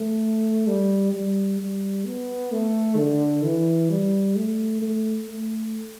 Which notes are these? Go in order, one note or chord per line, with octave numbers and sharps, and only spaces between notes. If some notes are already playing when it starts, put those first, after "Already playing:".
Already playing: A3
G3
G3
G3
B3
A3
D3
E3
G3
A3
A3
A3